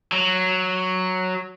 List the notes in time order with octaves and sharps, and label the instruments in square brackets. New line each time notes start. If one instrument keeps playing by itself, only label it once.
[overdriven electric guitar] F#3